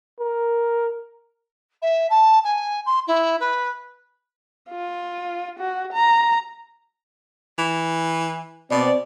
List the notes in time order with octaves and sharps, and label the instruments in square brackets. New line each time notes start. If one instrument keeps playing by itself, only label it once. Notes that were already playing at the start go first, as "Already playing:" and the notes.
[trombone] A#4
[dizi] E5
A5
G#5
C6
E4
B4
[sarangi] F4
F#4
A#5
[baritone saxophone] E3
[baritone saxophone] B2 [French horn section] C4 D5